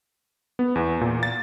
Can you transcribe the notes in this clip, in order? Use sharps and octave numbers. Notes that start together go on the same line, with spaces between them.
B3
E2
A#2
A6